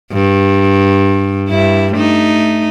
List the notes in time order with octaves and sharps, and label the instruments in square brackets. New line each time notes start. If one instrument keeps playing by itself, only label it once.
[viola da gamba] G2
G2 E4
A3 D#4